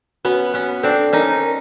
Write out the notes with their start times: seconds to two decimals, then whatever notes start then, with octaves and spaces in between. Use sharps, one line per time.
0.25 B3 C#4 F#4
0.54 B3 C#4 F#4
0.83 C4 D4 A4
1.13 C#4 D#4 A#4
1.43 A#4